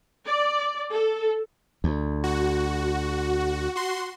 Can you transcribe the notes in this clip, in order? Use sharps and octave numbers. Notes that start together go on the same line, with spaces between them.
D5
A4
D2
F#4
F#4 C6